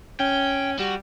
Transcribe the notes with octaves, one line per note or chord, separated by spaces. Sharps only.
C#4 G5
G3 F#4